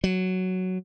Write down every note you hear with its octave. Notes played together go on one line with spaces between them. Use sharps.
F#3